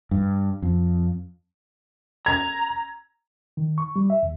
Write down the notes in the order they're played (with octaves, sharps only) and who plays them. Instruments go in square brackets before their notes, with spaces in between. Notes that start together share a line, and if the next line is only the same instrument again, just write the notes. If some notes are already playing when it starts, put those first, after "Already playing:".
[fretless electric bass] G2
F2
[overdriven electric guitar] A#5 [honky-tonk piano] G#6
[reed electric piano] D#3
C#6
G3
E5
D#2